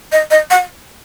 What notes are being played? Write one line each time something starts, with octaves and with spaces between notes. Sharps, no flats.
D#5
D#5
F#5